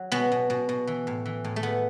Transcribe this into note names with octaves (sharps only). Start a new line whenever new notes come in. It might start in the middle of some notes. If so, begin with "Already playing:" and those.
Already playing: F#3
B2 B3
B2
B2
B2
E3
A2
E3
A2
A3
E3 B3